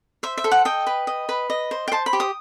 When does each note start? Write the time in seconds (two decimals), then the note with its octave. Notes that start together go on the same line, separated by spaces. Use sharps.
0.23 C5 E5
0.38 E5
0.44 A4
0.51 F#5
0.65 D#5 G5
0.87 B4
1.07 D#5
1.29 B4
1.50 D#5
1.71 C5
1.88 G5
1.92 C5 A5
2.06 B5
2.13 G4
2.20 D#6